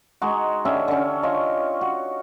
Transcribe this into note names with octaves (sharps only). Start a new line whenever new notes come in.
G#3 D#4 F#4
D3 C#4 G4 E5
D3 C#4
F4 C#5 D#5
F#4